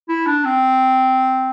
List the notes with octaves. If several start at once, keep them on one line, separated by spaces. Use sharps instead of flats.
E4
D4
C4